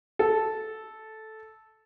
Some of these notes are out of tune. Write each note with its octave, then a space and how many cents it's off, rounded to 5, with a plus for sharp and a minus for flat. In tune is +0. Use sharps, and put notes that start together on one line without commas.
A4 -10